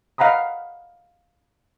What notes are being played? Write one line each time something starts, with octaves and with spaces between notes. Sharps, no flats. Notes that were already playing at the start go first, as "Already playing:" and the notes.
D#5 F5 F#5 A#5 B5 D#6